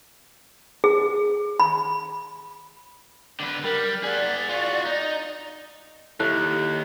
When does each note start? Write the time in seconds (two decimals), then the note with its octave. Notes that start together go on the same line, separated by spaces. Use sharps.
0.84 G#4
1.60 B5
3.40 D3 B4
3.64 G3 A#4
4.04 G#4 D5 F#5
4.49 F4 F#4
4.85 D#4
6.20 D#2 E4 G4 A4 C#5 F#6